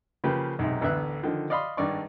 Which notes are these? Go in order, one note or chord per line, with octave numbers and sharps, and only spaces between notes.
C#3 F3 A#3 G4 B4
B1 G#2 C3
A1 D2 B3 E5 F#6
D3 D#3 F3
D5 D#5 F5 B5 C6
G#1 G2 D5 C#6